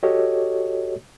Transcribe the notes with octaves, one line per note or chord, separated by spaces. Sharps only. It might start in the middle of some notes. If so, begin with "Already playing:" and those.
F#4 G4 A4 C#5 D#5